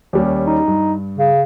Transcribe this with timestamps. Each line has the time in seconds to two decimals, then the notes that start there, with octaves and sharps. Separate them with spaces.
0.13 D#2 G3 C#4
0.46 D#4
0.68 G2
1.18 C#3